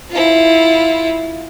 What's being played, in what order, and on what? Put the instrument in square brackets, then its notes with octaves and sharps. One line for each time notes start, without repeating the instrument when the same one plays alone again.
[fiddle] E4 F4